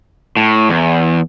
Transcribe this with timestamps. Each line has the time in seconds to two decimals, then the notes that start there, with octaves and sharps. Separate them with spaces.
0.37 A2
0.69 E2